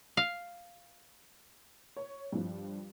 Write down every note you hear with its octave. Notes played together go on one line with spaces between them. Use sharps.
F5
C#5
G2 F3